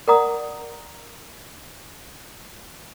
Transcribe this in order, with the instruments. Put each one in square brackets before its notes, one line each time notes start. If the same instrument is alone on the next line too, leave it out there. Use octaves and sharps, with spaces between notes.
[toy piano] A#4 D5 F#5 A#5 D#6